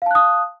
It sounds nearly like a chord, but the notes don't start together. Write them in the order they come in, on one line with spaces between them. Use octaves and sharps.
F5 A5 F#6 D#6